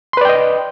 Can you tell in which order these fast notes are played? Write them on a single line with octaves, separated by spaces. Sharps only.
C6 B4 D5 G5 D#5